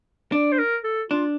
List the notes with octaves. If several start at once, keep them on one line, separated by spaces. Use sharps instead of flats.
D4 D5
C5
A#4
A4
D4 F4